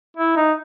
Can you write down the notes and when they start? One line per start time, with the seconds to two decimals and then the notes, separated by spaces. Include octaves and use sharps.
0.17 E4
0.36 D#4